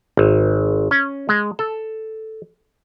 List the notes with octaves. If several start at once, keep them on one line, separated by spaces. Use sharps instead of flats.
G#1
C#4
G#3
A4